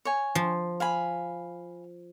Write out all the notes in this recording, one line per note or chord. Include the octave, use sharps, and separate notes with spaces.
C#5 G#5
F3
F5 G#5 B5